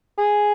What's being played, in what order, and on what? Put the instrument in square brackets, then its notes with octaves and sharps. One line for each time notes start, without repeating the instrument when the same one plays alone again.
[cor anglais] G#4